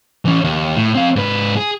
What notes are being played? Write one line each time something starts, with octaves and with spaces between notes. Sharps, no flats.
E3 C#4
D#2
A2
C4 F5
G#2 B4
G#4